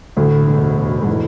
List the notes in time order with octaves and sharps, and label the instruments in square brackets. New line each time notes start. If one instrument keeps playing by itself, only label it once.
[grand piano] D2 [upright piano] A2
[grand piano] E1
E1
[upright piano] G#2
[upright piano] A2 [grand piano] E3